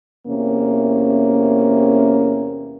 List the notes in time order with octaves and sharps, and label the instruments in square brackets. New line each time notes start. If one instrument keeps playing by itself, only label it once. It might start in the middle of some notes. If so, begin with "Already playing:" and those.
[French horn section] E2 C3 A#3 C#4